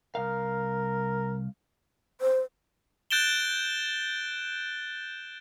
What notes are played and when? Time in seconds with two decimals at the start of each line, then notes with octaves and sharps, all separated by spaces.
0.15 C2 A#4 F5
2.21 C5
3.11 F#6 G6 A6 D7 E7 G7